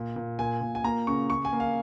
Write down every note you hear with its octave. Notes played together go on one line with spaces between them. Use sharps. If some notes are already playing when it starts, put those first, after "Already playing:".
Already playing: A#2
A#2
A#2 G#5
A#2
G#5
A#3 A#5
C#3 C#6
C#3 C#6
G#5
A#3
F5